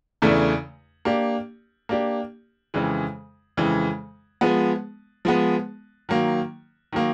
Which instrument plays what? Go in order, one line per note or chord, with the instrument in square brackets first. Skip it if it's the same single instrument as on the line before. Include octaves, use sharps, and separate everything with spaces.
[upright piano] E2 C#3 E3 A3 D4
A#3 D4 G4
A#3 D4 G4
F2 C#3 E3 G#3
F2 C#3 E3 G#3
F3 G#3 B3
F3 G#3 B3
D#3 F#3 A#3
D#3 F#3 A#3